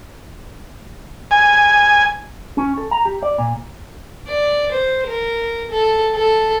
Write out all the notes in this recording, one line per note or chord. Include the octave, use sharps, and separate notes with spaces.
G#5
C#4
A4
A#5
G4
D5
A#2
D5
C5
A#4
A4
A4